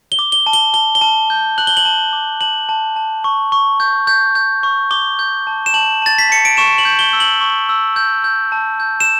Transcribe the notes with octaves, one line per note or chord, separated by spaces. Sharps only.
G7
D6
G7
A5
G7
A5 G7
G7
A5
G6
F#6 F#7
G7
F#7
A5
D6
A5 F#7
A5
A5
C#6
C#6
G6
G6
G6
C#6
D6 G7
G6
A5
E7
A5 F#7
A5 A6
B6
A5 C#7
D7
C#6 E7
F#7
G6
G7
E6
F#7
C#6
E6
G6
G6
A5
G6
E7